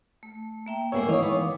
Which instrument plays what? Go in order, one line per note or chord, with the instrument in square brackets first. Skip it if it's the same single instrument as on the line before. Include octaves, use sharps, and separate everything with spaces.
[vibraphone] A3
A#3 E5 G5
[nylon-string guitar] G3 A#3 [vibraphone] G#3 G#5 E6 [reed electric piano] B3 C#5
[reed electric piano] D#3 E3 [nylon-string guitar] C#5 D#5 [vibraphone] F5 D6 D#6
[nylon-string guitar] B3